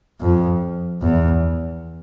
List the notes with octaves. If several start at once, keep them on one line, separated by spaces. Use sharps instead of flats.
F2
E2